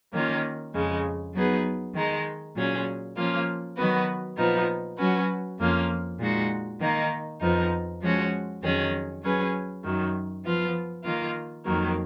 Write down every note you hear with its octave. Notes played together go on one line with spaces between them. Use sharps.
D#3 A#3 C#4 F4
F2 C#3 G#3
F#3 B3 D#4 G#4 B4
D#3 G#3 D#4
A#2 F#3 C#4 G#4
F3 A#3 C#4 F4
D#3 F#3 B3 F#4 B4
A#2 F3 B3 D#4
F#3 C#4 F#4 B4
F2 F3 A#3 C#4 F4
A#2 G#3 D#4 F#4
D#3 A#3 D#4
F2 F3 B3 D#4
F3 G#3 C#4 F#4
F2 D#3 F#3 C#4 G#4
F#3 C#4 G#4 B4
F#2 D#3 F#3
F3 B3 F4
D#3 A#3 F4
F2 D#3 F#3 A#3